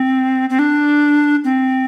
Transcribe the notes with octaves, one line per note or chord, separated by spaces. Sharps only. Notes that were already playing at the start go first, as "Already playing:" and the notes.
Already playing: C4
C4
D4
C4